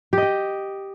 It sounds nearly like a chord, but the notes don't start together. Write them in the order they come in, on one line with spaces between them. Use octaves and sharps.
G4 D#5 G5